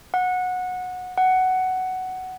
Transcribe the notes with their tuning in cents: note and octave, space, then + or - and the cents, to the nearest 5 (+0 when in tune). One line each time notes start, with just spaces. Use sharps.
F#5 -20
F#5 +10